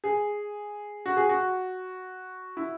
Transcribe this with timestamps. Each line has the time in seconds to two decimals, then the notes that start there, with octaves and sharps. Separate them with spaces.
0.04 G#4
1.06 F#4
1.17 G#4
1.29 F#4
2.57 E4